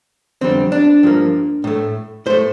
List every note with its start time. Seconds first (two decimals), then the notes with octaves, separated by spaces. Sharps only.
0.41 F2 D3 G3 C4
0.72 D4
1.03 G2 F3 A#3
1.64 A2 A3
2.26 A2 A3 C5